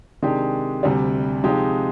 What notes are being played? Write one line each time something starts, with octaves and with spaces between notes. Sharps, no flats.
C3 D#3 G#3 D4 G4
D2 C3 G3
C3 F3 G#3 D#4 G4